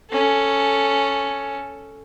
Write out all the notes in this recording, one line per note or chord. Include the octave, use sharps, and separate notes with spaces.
C#4 A4